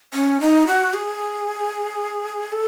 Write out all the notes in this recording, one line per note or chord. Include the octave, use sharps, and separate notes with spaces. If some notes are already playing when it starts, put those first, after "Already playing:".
C#4
D#4
F#4
G#4
A4